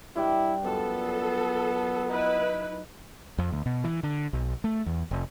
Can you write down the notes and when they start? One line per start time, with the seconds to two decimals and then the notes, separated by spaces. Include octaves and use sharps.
0.16 G2 E4 D5 G5
0.64 F#2 F3 B3 A4
2.09 D#4 E4 B4
3.38 F2
3.52 D2
3.66 B2
3.84 E3
4.03 D3
4.33 B1
4.64 A3
4.86 E2
5.11 F1